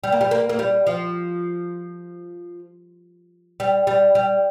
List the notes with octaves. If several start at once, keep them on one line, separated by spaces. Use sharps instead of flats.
G3
A#3
G3
A#3
A#3
G3
F3
G3
G3
G3